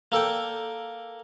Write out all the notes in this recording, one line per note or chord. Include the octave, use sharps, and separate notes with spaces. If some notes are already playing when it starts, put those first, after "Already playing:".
A#3 A4 D5 G5